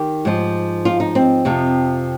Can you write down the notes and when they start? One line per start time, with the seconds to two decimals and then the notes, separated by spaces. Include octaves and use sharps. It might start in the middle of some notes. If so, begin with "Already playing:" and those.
Already playing: D#3 G4
0.25 G#2 F3
0.85 F4
1.00 D#4
1.15 C4
1.45 F2 C3 F3